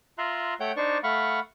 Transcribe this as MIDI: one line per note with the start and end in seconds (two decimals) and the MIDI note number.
0.18 0.54 65
0.18 0.54 76
0.18 0.54 82
0.18 0.54 84
0.18 0.54 90
0.60 0.72 57
0.60 0.72 73
0.60 0.72 78
0.60 0.72 79
0.60 0.72 91
0.77 0.98 62
0.77 0.98 63
0.77 0.98 72
0.77 0.98 74
0.77 0.98 85
1.04 1.40 57
1.04 1.40 77
1.04 1.40 78
1.04 1.40 83
1.04 1.40 85